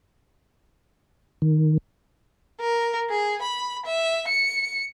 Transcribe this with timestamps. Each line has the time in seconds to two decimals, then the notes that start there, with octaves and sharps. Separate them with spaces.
1.42 D#3
2.61 A#4
3.09 G#4
3.42 B5
3.86 E5
4.28 C#7